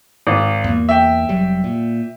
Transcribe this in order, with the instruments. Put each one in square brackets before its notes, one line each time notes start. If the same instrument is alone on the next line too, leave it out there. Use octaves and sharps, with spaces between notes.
[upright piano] G#1
[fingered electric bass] E2 A#3
[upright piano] E5 G5
[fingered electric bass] F1 F#3 G3
A#2